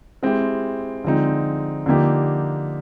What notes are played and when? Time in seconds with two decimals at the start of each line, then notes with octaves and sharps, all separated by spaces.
0.23 G#3 C4 E4 G4
1.04 D3 F3 G#3 C4 D#4
1.86 D3 F3 A#3 D#4 G4